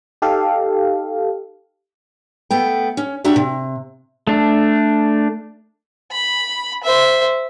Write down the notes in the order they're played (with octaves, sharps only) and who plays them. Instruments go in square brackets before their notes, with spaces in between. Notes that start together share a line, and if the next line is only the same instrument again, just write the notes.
[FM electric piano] D#4 G4 A4 F5
[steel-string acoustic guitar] A3 B3 G5
C#4
D4 F#4 G4 E5 A#5
C3
[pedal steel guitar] A3 D4
[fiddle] B5
C5 E5